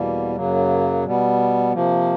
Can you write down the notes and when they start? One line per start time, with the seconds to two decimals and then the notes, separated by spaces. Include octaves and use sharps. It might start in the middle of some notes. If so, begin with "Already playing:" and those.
Already playing: E2 B2 G3 A#3
0.35 F#2 C#3 F#3 A#3
1.04 B2 G3 B3
1.72 C3 F3 A#3